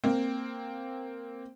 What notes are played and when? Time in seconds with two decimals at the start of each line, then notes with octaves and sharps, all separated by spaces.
0.04 A#3 C4